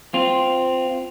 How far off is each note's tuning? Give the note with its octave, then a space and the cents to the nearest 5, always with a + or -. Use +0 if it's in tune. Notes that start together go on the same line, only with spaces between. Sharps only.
C4 -10 F4 +0